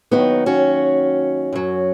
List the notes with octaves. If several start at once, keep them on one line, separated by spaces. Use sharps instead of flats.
D#2 D#3 F#3 B3 D#4
C#4 F#4
F#2 F#3